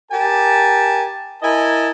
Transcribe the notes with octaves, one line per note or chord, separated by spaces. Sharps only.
G4 A#4 G#5 A5
E4 A#4 D#5 G#5 A5